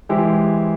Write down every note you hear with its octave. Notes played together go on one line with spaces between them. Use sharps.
E3 G#3 E4 G4 C5